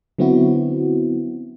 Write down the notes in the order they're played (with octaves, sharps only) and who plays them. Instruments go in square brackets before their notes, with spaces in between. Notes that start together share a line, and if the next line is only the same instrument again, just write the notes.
[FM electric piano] D3 F#3 B3 C4 E4 F#4